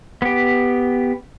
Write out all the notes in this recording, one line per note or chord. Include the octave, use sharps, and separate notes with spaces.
B3 G4